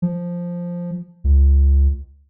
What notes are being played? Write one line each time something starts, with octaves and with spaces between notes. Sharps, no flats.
F3
C#2